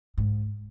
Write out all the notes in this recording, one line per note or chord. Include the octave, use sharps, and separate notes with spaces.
G#2